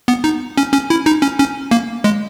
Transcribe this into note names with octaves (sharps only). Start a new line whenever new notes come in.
B3
D#4
C#4
C#4
E4
D#4
C#4
C#4
A#3
G#3